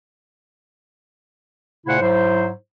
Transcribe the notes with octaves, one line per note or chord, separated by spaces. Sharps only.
A#2 C#3 A3 E4 C5 F#5
G#2 F#3 E4 C5